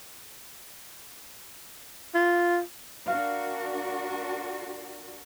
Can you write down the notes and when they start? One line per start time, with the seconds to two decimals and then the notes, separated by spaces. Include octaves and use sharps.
2.15 F4
3.08 D4 F#4 A#4 F5